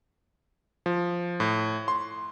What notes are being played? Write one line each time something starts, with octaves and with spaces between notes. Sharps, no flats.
F3
A2
C6